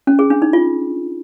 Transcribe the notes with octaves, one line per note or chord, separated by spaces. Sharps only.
C#4
G#4
D4
D#4
F4